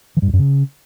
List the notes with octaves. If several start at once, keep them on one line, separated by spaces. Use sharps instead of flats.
E3
G2
F2
F#2
C#3